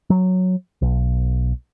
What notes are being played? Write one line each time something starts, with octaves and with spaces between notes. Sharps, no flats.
F#3
B1